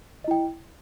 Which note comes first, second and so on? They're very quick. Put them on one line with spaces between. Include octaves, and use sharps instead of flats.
D#5 E4 G5